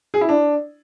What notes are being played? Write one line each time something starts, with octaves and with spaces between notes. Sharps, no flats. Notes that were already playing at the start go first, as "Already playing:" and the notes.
G#4
E4
D4